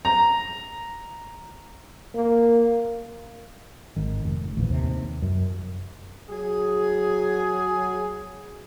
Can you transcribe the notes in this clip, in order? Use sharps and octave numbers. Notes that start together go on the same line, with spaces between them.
A#5
A#3
G#1 D#3
F1
A1 D2 A#2 E3
D#2 C3
F#2
F#3 G#4